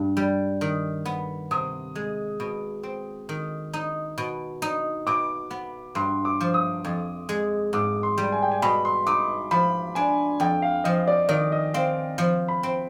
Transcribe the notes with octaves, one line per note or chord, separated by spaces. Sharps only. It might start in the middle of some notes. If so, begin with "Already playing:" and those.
Already playing: G2
G3
D#3
B3
C3 D#6
G#3
B2
C4
D#3
D#4
B2
D#4
B2 D6
B3
G2 C6
D6
F3
D#6
F2
G#3
G#2 D6
C6
G3
G#5
G5
G#5
B2 B5
C6
D#4 D6
F3 B5
D4 G#5
F2 G5
F5
F3 D#5
D5
D#3 D5
D#5
C4 F5
F3
B5
C4